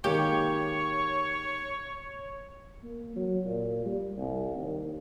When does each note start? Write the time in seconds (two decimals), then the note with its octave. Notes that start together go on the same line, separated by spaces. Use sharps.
0.04 D#3 G#3 A#3 G4 C#5 C#6
2.84 A#3
3.16 F#3
3.46 A#2
3.86 G3
4.17 C2
4.56 D#2